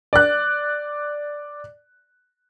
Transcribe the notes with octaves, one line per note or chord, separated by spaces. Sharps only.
D5 F#6